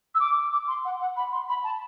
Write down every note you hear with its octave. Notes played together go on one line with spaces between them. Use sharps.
E6
D6
D6
C6
F#5
F#5
B5
C6
B5
A5